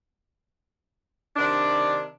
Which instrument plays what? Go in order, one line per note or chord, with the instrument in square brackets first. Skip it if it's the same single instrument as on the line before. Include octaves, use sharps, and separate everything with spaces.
[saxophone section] C3 D#3 D4